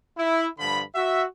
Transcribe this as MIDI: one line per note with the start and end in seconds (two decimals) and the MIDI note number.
0.17 0.47 64
0.59 0.82 43
0.59 0.82 50
0.59 0.82 53
0.59 0.82 83
0.95 1.24 66
0.95 1.24 76